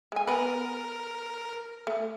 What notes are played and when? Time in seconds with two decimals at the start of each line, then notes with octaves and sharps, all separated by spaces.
0.12 G#3 G#5
0.27 B3 A#4 B4
1.87 A3